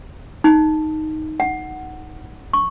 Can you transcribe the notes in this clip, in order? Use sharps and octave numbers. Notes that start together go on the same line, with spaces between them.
D#4
F#5
C#6